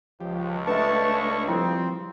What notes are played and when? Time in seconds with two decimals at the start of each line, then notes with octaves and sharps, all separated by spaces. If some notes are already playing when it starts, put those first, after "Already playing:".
0.20 C#2 F3 G4
0.67 A3 D4 B4 D#5 E5 A5 C#6
1.48 F3 G3 C4 E4 A4